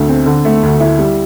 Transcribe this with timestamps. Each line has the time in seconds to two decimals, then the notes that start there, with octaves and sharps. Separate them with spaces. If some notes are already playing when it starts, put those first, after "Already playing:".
Already playing: D2 D3 A3
0.08 C4
0.26 D3
0.45 A3
0.63 D2
0.80 E4
0.99 G3